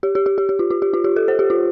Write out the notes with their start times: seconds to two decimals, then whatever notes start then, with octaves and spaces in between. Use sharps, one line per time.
0.03 G4
0.15 G4
0.26 G4
0.38 G4
0.49 G4
0.59 F4
0.70 F4
0.82 G4
0.94 F4
1.04 G4
1.16 A4
1.28 C5
1.39 G4
1.50 F4